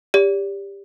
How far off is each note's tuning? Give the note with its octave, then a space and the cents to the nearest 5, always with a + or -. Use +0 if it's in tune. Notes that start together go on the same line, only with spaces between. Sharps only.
G4 +20 D5 -40